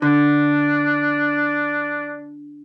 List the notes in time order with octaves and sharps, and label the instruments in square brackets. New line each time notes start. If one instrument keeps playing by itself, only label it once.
[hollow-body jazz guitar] D3 [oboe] D4